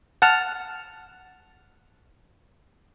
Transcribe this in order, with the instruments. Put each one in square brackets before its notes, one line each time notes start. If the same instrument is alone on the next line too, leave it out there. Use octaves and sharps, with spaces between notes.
[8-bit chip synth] F#5 A5 F6